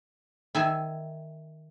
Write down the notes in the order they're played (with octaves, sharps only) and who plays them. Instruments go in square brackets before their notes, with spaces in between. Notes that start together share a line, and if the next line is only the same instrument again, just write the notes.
[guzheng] D#3 E5 G#5